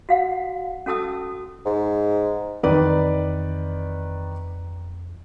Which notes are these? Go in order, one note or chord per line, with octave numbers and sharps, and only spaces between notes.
F#4 F5 F#5
C#4 F#4 A4 A5 D#6 E6
G#2
F2 D#3 E3 C4 B4 D5